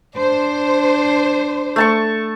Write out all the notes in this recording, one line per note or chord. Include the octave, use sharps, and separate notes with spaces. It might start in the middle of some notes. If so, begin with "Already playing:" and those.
D4 C5
A3 A5 C#6